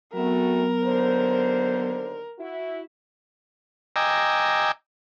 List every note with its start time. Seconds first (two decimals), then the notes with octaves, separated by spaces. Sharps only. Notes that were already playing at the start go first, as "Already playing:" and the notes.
0.13 F#3 A3 B3 C4 F#4 A#4
0.82 D#2 D3 C5
2.39 E4 F#4
3.96 D#5 G5 G#5 A#5 D6 E6